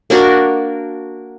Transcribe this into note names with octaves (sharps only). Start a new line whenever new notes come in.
A#3 D4 F#4 A#4